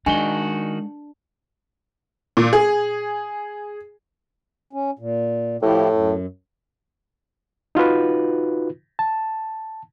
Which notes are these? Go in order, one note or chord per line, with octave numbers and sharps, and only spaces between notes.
D#3 G#3 D4 D#4 F#4 G#5 G7
A#2
G#4
C#4
A#2
A2 F3 E4 G4
F#2
D#4 F4 F#4 B4
A5